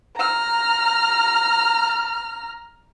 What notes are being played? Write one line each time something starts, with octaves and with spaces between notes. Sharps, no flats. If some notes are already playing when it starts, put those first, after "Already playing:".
A#5 F6